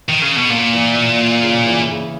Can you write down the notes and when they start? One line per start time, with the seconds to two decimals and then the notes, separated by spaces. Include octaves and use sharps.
0.09 D#3
0.22 C#3
0.36 B2
0.50 A#2 A#3
0.73 E3
0.96 A#3
1.20 A#3
1.43 C#3
1.66 E3
1.90 C#3